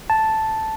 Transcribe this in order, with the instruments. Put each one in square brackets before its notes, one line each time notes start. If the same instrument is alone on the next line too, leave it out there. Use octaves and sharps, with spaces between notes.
[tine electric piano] A5